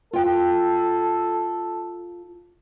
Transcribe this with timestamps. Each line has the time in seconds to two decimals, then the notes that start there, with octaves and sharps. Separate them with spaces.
0.13 F4 A4 G5